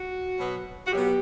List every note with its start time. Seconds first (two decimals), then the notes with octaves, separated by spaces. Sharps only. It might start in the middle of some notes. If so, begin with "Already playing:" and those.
Already playing: F#4
0.38 B2 F#3 B3
0.87 F#4
0.92 B2 F#3 B3 G4